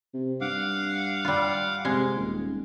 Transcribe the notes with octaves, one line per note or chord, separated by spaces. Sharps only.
C3
G2 F5 F#5 D6
G3 F4
C3 G#3
D#1